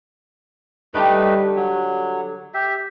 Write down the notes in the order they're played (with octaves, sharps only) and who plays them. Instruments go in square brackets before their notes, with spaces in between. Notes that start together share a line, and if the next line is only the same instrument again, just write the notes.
[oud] D3 G3 G4 [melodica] A3 D#4 B4
[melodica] F#3
G4 E5